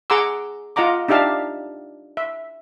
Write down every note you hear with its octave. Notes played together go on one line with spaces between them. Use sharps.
G#4 F#5 A#5 C6 D6 E6
F4 D#5 F#5 A#5 D6
D4 D#4 G4 E5 F5 A5
E5